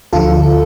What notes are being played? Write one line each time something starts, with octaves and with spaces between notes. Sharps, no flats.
D2 D3 F3 F4 A4